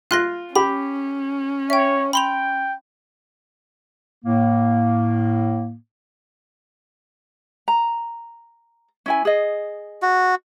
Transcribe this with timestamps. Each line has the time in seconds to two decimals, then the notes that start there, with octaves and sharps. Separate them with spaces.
0.11 F4 F5 C6 F#6 A#6
0.55 C#4 G4 B5
1.70 C#5 E5 G5
2.13 G5 B5 C6 F7
4.25 A2 A#3
7.68 A#5
9.06 C#4 E4 G#5
9.25 G#4 D#5
10.02 F#4